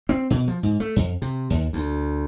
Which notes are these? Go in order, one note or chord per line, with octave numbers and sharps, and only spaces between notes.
C4
B2
F3
G#2
A3
F2
C3
D#2
D2